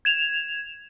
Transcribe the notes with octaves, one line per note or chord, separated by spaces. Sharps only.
G#6 E7 F7